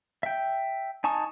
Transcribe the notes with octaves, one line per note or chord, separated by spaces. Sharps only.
E5 G5
D#4 G#5 A5 C#6 D#6